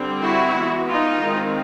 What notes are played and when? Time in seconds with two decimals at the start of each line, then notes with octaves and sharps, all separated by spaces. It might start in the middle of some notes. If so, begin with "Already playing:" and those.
Already playing: D3 G3 C4
0.21 E4 F#4
0.56 E3 G#3 B3
0.89 D#4 F4
1.22 D#3 G#3 C4